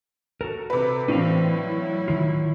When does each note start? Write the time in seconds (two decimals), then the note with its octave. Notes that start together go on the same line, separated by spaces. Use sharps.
0.41 F#4 A4 A#4
0.70 C3 B4
1.08 A2 E3 C4 B4 D5 F5
1.54 F#3 E4
2.08 D#3 F4